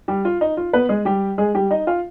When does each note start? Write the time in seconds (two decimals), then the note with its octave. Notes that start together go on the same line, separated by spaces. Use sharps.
0.08 G3 G4
0.25 F4
0.41 D#4
0.57 F4
0.73 B3 B4
0.89 G#3 G#4
1.05 G3 G4
1.38 G#3 G#4
1.54 G3 G4
1.71 D#4 D#5
1.87 F4 F5